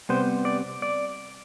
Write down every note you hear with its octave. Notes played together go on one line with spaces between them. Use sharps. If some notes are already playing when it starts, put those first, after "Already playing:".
C3 G3 B3 C5
D5
D5